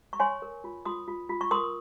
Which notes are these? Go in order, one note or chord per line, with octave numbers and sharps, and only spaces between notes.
C#6
C#5 G#5 C6
A#4
F4
F4 C6 D#6
F4
F4
C#6
A#4 C6 D#6